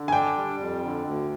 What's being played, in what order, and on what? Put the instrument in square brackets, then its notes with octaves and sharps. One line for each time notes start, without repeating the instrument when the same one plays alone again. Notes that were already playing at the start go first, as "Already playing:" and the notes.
Already playing: [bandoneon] D3
[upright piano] G#5
[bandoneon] D4 [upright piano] G5
[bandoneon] G3
F2
D3
D2